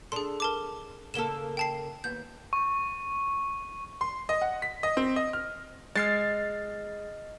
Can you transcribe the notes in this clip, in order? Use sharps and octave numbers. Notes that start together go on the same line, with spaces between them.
D4 G#4 A4 C6
A#4 A5 D6
C#3 A#3 A4 E7 G7
G5 A5 C7
D#2 B3 G6
C#6
C6
D#5
F#5
B6
D#5
C4
D#5
F6
G#3 D#5 F6 A6 C7